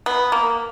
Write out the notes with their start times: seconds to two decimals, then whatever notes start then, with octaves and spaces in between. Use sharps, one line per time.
0.06 B3
0.32 A#3